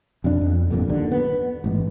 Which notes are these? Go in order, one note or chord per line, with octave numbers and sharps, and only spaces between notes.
F2 B2 D4
F2
G1 F2 A#2 D3
D#2 D3
B3
A1 G#2